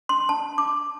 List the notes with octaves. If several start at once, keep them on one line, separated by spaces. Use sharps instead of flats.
C6
A5
D6